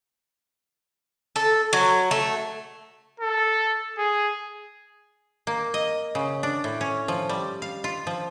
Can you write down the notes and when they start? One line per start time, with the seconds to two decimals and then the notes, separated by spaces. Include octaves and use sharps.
1.36 A4
1.73 F#3
2.11 A3
3.20 A4
3.98 G#4
5.47 A#3
5.74 D#5
6.15 C#3
6.43 D4
6.64 A2
6.81 C#4
7.08 F3
7.29 G3
7.62 F5
7.84 F4
8.07 F3